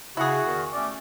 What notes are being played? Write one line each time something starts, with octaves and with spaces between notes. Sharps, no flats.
C#3 E4 F#4 G#4 F#5
E2 D#3
A3 C#4 D5